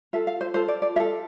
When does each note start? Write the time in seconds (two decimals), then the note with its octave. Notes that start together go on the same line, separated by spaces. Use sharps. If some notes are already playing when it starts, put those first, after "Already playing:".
0.13 F4 A4 E5
0.27 F5
0.41 C5
0.54 F4 A4 C5
0.68 D5
0.82 D5
0.96 F4 E5
1.00 A4